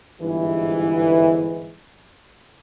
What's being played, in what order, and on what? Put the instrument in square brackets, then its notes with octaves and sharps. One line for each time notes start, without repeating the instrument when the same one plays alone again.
[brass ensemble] G1 G#2 E3